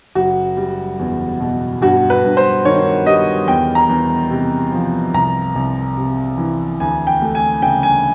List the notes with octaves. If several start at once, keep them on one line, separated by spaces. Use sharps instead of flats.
F#1 F#4
G3
E2
B2
G2 F#4
B4
G2
C5
D#3 C#5
G3 D#5
E2 G5
A#5
E2
C3
F3
C2 A#5
C2
C3
E3
D2 G#5
G5
A3
G#5
C#3 G5
G#5